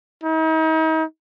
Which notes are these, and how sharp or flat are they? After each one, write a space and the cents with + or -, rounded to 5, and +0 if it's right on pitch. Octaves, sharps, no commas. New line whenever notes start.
D#4 +40